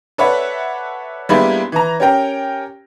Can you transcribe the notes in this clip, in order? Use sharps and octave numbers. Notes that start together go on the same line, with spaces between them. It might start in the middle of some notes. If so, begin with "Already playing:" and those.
A4 B4 C#5 D5 E5 F#5
G3 G#3 A#3 B3 D4 E4
E3 A#5
C#4 G4 A#4 G5